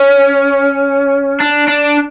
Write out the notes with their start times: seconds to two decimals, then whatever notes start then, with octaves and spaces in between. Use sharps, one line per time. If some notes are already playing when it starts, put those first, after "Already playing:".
Already playing: C#4
1.40 D4
1.67 D4